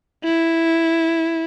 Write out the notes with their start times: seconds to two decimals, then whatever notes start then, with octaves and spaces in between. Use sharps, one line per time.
0.24 E4